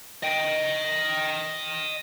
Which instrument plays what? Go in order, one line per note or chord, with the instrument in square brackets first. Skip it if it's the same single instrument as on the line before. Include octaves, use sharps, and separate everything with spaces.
[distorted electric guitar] D#5 G5